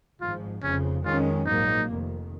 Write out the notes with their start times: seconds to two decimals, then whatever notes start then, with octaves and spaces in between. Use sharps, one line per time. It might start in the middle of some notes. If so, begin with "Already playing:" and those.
0.20 G#1 G#2 F3 F4
0.62 F1 F2 C#3 F3 C#4
1.04 F2 D#3 G#3 C#4 F4
1.46 A#1 G#2 F#3 A#3 D#4
1.88 F1 F2 D#3